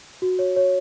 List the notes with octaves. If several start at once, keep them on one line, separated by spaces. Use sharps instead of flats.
F#4
C#5
C#5